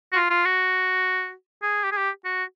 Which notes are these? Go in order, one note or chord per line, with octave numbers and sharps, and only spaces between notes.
F#4
F4
F4
F#4
G#4
G4
G#4
G4
F#4